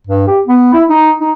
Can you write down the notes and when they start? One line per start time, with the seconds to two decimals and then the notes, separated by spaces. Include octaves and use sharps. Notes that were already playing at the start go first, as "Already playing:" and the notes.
0.07 G2
0.27 G4
0.46 B3
0.73 E4
0.89 D#4
1.20 D#4